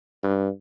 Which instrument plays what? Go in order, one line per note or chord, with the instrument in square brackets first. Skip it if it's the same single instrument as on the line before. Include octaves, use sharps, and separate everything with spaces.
[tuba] G2